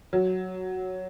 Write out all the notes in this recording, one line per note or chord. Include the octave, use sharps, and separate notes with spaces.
F#3